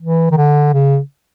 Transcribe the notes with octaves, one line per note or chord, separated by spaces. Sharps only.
E3
D#3
D3
C#3